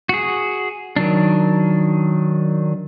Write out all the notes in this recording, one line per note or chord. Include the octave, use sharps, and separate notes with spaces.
F#4 G#4
D#3 F#3 D4